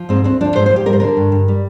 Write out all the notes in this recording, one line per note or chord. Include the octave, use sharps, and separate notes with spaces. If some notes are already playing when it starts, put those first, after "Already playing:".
Already playing: F3
G#2 C4
D2 C4
F3 D4
G#2 C5
C5
F3
G4
G3 A#4
C5
D3 A#4
G2
G2
G3